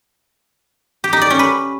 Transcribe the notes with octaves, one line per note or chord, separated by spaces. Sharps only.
G4
D#4
D5
C#4
B4